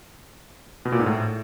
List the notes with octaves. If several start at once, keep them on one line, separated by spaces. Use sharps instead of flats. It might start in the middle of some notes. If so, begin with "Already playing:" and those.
B2
A#2
G#2
A2